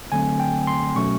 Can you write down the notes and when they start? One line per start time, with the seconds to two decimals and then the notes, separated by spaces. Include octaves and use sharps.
0.12 D3 F#3 A3 C4 G#5
0.40 G5
0.67 C6
0.96 B2 F#3 A3 C#4 C#6